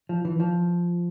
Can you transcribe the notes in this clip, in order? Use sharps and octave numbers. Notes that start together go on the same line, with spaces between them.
F3
E3
F3